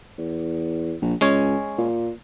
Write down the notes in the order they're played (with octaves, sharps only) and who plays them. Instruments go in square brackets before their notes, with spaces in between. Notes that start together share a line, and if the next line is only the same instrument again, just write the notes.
[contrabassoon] E2
A#1
[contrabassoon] C#2 [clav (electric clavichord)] G#3 C#4 C#5
[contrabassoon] A#2